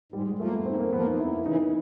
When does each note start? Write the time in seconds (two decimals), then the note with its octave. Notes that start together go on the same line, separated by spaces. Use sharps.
0.12 G#2 G3
0.26 G#3
0.39 F3 A3
0.44 A#3
0.53 B3
0.65 G#2 C4
0.80 A#3
0.93 F3 A#3 B3
1.07 D#4
1.19 F2 E4
1.46 C#3 E3 D#4